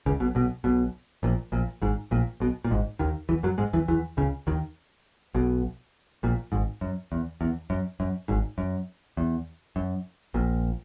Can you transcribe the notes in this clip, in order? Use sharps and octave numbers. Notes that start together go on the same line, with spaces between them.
C#2 C#3
B1 B2
B1 B2
B1 B2
A#1 A#2
A#1 A#2
G#1 G#2
A#1 A#2
B1 B2
A#2
G#1 G#2
D#2 D#3
E2 E3
F#2 F#3
G#2 G#3
E2 E3
E2 E3
C#2 C#3
D#2 D#3
B1 B2
A#1 A#2
G#1 G#2
F#2
E2
E2
F#2
F#2
G#1 G#2
F#2
E2
F#2
A#1 A#2